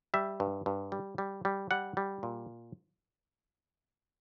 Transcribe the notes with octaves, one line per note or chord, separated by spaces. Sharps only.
G3 E5
G2
G2
G3
G3
G3
G3 F#5
G3
A#2